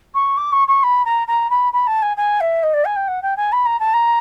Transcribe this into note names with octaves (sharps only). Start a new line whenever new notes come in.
C#6
D6
C#6
C#6
B5
A#5
A#5
B5
B5
A5
G#5
G#5
E5
D#5
D5
G#5
G5
F#5
G5
G#5
B5
A#5
A5
A#5